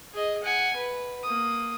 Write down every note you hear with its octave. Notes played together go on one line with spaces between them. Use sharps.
G#4 D#5
F#5 G#5
B4
A#3 D#6